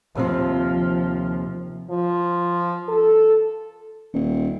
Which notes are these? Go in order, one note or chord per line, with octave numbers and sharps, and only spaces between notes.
D#2 C3 F3 C4
F3
A4
D#1